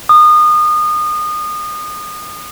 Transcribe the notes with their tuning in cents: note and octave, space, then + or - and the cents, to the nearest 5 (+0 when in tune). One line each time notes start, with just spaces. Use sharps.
D#6 -30